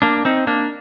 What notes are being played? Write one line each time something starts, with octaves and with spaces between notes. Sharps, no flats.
A#3 D4
C4 D#4
A#3 D4